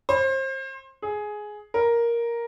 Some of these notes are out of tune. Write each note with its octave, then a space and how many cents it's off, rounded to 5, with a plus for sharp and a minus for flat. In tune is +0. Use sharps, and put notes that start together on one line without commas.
C5 +30
G#4 +10
A#4 +5